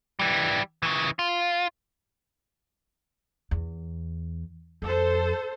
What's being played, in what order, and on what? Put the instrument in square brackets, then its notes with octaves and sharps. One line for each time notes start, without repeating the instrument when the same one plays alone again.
[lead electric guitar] E3 G3
C#3 E3
F4
[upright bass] E2
[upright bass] F2 [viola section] A4 C5